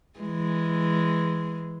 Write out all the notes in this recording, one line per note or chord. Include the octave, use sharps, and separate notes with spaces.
E3 G#3